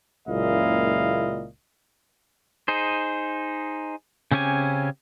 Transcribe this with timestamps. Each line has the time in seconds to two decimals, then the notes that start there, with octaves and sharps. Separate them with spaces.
0.28 F#1 C#2 A#2 E4 D#5 F5
2.68 D#4 G#4 C5
4.31 C#3 C4 C#4 G4 G#5